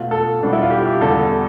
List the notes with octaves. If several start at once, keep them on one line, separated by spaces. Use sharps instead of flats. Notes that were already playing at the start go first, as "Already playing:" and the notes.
Already playing: B2 A3 F4
A4
E2 B2 G3 D4
E4
F4
G4
G4
E2 D3 G3 A4